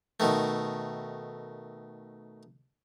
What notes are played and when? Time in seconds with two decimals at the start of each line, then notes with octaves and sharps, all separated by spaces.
0.20 B2 D#3 A3